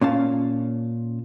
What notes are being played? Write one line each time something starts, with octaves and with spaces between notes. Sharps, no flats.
A#2 C#4 F5 A5